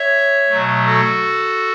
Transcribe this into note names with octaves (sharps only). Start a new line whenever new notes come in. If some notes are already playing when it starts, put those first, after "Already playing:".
Already playing: C#5 E5
B2 F#3 A3
F#4 A4